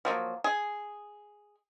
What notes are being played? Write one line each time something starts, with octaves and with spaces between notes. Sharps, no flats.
F3 F#3 A#3
G#4